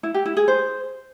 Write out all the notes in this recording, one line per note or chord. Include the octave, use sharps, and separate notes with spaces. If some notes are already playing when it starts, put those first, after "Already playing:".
E4
G4
E4
G#4
C5